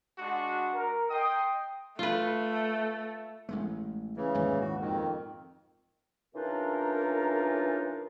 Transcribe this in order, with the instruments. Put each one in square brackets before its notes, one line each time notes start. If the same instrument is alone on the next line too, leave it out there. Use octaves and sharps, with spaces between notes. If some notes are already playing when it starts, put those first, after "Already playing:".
[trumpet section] G#3 D4 F#4
[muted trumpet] A#4
[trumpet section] D#5 C6 D#6 [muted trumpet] G5
[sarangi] A3 [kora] F4 B4
[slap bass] A1 G#3 A3
[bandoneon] C#3 E3
[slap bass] D#1 G#2
[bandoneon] F#4
F2 D#3
[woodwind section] C#3 E3 D4 D#4 F4 A#4